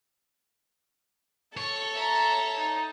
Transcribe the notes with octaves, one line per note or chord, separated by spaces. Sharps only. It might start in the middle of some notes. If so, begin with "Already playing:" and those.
A4 C#5 A5 C#6
E5 A#5
D#4